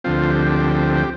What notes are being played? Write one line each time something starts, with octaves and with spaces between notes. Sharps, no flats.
D2 D3 F3 C4 F4
G4